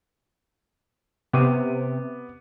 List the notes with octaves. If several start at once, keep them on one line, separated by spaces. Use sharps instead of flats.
C3 B3 D6 D#7